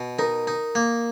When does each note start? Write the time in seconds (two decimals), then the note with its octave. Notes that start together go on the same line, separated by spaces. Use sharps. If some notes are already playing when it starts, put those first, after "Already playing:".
Already playing: B2
0.19 D#4 A#4
0.47 D#4
0.75 A#3